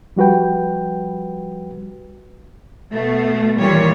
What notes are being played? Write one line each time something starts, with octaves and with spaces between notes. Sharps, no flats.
F3 G3 F#4 B4 G5
B2 A3
A#2 D#3 E3 G3 C#5